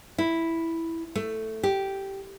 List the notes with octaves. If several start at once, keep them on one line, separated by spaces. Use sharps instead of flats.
E4
A3
G4